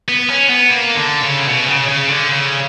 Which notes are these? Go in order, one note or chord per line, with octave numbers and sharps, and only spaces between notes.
B3
C#4
B3
A#3
D3
C#3
B2
C#3
C#3
D3
C#3